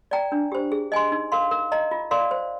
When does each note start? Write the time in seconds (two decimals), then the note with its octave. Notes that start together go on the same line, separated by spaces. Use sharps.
0.11 D5 G5 A#5
0.32 D4
0.52 G4 C5
0.72 G#4
0.92 D#5 G#5 C6
1.12 D#4
1.32 A#4 F5 C6
1.51 A#4
1.72 D#5 A#5
1.91 F4
2.11 A#4 D5 F5 C6
2.31 C5